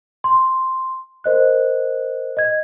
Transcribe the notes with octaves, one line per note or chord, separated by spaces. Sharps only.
C6
A#4 C5 D#5 F#6
D#5 G#6